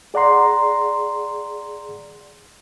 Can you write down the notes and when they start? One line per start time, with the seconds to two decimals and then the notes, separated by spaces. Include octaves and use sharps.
0.14 G#4 D5 F#5 A#5 C6